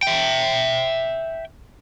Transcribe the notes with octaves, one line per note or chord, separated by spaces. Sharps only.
E5 G5